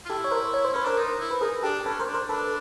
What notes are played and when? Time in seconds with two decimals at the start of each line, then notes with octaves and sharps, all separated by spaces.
0.05 F4
0.09 E4 G4 A4
0.24 C#5
0.31 A#4 C5
0.54 C#5
0.64 C5
0.73 C#4 B4
0.85 D4 A#4 C5
0.98 D#4
1.20 E4
1.31 B4
1.41 D#4 G#4 A#4
1.63 D4 G4 A4
1.85 C#4 A4 B4
1.99 A#4 C5
2.07 D4
2.14 A#4 C5
2.29 D4 A4 B4